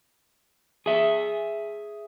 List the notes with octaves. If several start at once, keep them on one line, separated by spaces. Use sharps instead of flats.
G#4 E5